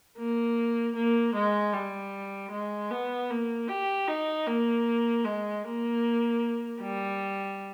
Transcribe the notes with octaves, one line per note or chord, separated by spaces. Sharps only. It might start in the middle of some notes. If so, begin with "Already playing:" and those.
A#3
A#3
G#3
G3
G#3
B3
A#3
G4
D#4
A#3
G#3
A#3
G3